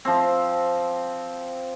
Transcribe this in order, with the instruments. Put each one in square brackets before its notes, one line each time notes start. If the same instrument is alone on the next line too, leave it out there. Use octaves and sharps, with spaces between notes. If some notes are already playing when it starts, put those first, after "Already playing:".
[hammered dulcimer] F3 C4